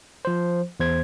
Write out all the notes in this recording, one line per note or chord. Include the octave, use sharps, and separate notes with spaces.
F3 C5
E2 C5 G#6